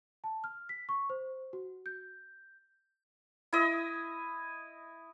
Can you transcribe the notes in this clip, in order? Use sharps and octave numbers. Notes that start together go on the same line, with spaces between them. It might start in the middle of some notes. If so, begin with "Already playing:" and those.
A5
F6
B6
C#6
C5
F#4
G6
E4 D#5